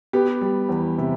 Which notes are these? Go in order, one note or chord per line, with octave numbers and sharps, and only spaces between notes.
B3 G4
G3
E2
C3